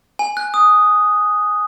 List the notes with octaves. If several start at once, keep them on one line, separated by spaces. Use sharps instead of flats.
G#5
F#6
D#6